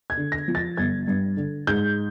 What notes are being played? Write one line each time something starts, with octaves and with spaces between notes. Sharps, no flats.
G#6
D3
A#6
F3
A6
G1 G#6
G2
D3
G#2 G6